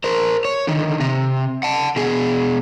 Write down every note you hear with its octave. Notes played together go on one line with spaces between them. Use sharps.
A#4 C5
C#5
D3 D#3
C3
F#5 A5
B2 G#4